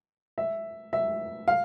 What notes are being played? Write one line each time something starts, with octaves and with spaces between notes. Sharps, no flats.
E5
E5
F5